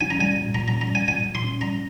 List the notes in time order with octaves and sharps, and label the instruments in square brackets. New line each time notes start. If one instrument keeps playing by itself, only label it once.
[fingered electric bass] C#4 [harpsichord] G#5
[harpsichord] A#5
[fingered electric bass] G3 [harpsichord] G#5
[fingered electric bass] A#2
[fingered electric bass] A#2 [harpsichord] A#5
[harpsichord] A#5
[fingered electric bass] C#4
[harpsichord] A#5
[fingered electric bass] G3
[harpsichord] G#5
[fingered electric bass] A#2 [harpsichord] G#5
[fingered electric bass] A#2
[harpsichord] C6
[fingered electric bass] C#4
[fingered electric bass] G3 [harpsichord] A#5